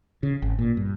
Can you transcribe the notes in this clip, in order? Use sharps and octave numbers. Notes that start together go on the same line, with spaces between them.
C#3
G#1
A#2
G2